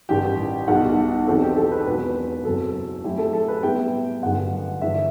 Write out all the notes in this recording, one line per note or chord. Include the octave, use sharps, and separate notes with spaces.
A1 G2 D#3 G3 G4
B1 B2 G3 D#4 F#5
E2 D#3 F#3 C4 D#4 A4
G4
A4
B4
E1 D#2 D#3 F#3 B4
F#1 F#2 F#3 C4 A4
F#2 D#3 A3 C4 E4 G4
A4
A4
B4
A2 G3 B3 E4 G5
G1 F#2 D#3 G3 F#5
G1 G2 E3 E5